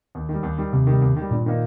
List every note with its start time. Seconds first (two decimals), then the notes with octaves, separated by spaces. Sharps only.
0.15 D#2
0.29 D#3 G3
0.43 D#2
0.58 D#3 G3
0.73 D#2 C3
0.87 D#3 G3
1.02 D#2
1.16 D#3 G3
1.31 G2 A#2
1.46 D#3 A#3 D#4